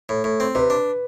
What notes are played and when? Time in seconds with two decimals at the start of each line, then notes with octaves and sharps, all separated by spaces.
0.09 A2
0.24 A2
0.40 C4
0.55 C3 B4
0.70 D4